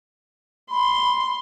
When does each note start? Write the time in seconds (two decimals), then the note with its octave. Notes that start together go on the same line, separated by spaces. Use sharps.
0.70 B5 C6